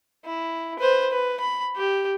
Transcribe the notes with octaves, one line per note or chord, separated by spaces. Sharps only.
E4
B4 C5
B4
B5
G4